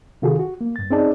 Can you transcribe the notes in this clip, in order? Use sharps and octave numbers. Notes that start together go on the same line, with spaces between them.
C3 D#3 F4 F#4 G#4 A4
F#4
A#3
G2 A6
C4 C#4 D#4 G#4 D5 A5